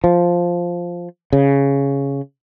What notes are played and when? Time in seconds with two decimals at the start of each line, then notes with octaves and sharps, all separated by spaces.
0.04 F3
1.33 C#3